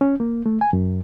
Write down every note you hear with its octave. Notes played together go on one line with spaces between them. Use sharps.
C#4
A#3
A3
G#5
F#2